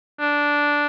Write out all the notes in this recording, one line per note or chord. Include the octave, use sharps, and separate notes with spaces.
D4